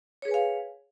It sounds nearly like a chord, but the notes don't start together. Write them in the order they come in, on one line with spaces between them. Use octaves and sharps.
C#5 G#4 B4 G#5 F5